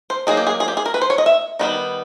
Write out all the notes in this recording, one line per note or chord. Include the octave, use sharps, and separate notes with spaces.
C5
F#3 A#3 D#4 G#4
G4
G#4
G#4
G4
G#4
A#4
B4
C5
C#5
D#5
E5
D#3 G3 B3 D#4